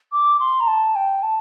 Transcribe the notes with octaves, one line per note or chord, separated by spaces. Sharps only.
D6
C6
A#5
A5
G5
A5